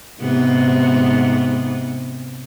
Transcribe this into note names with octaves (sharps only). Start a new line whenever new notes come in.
G#2 C3 B3